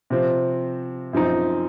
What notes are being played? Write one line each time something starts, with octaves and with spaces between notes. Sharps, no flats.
C3 F3 C4
F#2 F3 C4 D#4